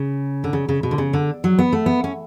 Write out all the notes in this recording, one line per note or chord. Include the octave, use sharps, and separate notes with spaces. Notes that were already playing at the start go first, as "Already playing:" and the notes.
Already playing: C#3
D3
C#3
C#3
B2
D3
C#3
D3
F#3
B3
A3
B3
C#4